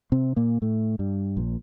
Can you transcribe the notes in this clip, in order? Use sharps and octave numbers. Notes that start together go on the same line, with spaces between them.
C3 C4
A#2 A#3
A2 A3
G2 G3
A#1 A#2